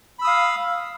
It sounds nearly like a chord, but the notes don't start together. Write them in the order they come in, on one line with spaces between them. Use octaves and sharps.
B5 E6 D#6 F5